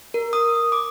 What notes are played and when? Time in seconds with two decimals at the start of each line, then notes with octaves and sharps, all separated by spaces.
0.14 A#4
0.33 D#6
0.72 D6